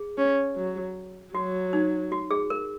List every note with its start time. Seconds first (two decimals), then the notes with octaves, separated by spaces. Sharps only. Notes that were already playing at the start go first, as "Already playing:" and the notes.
Already playing: G#4
0.18 C#4
0.57 F#3
1.33 F#3 F#4
1.73 D#4
2.12 F#4
2.31 G#4
2.50 A#4